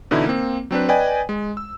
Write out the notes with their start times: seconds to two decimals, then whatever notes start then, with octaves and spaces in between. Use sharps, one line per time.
0.11 B2 D3 E3 D#4 E4
0.26 A#3 C4
0.71 F#3 C4 D4 B4
0.89 B4 D5 D#5 G5 G#5
1.29 G#3
1.57 E6